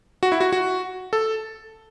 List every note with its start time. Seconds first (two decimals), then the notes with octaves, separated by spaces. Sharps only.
0.23 F#4
0.32 E4
0.41 F#4
0.53 F#4
1.13 A4